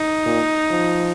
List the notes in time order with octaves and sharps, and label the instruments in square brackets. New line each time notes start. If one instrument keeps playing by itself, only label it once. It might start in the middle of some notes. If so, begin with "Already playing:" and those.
Already playing: [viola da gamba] D#4
[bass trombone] A#2
F3